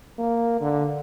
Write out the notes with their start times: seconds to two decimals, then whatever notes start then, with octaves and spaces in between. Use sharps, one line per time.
0.19 A#3
0.61 D3